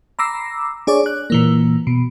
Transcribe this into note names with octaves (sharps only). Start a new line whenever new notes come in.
A#5 B5 D6 E6 A#6 C7
D4 G#4 C#5 D5
F#6
A#2 E3 A#3
B2